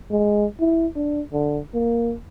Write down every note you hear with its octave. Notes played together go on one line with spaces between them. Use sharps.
G#3
E4
D4
D3
A#3